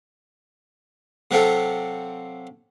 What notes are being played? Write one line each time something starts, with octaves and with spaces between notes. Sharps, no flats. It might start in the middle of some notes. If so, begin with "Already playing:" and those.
C3 F#3 C4 F4 A4